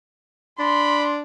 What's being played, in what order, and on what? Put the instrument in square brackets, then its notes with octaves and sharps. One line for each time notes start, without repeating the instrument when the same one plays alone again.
[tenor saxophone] D4 [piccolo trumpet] B5 [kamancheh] C6